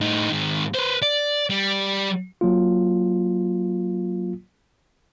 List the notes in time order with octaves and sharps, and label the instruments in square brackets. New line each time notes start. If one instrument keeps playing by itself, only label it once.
[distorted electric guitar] A2 D#4
G#2 D#3
B4 C5
D5
G3
[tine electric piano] F#3 A#3 F4